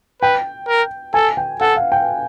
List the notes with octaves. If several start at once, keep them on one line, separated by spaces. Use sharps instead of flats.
B4 G5
A#4
A4 G#5
G5
A4 F#5
F5
G5